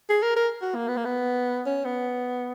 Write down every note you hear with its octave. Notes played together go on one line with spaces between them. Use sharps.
G#4
A#4
A#4
F#4
A#3
B3
A#3
B3
C#4
B3